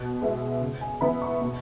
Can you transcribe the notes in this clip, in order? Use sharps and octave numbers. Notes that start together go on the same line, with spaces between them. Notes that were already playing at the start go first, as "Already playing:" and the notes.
Already playing: B2 F#6
G#3 B3 E4
C#3
G#5
E3 B3 E4 B5
C#6
B2